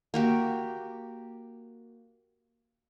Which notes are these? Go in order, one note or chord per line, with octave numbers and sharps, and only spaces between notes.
A#3 F#4 G4